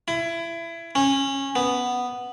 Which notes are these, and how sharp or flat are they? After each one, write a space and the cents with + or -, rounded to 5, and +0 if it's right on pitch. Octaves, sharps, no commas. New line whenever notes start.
E4 +25
C#4 -20
B3 +0